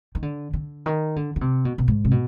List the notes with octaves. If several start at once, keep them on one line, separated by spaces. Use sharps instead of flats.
D#3
D3
D3
D#3
D3
D3
C3
B2
B2
G#2
C3
B2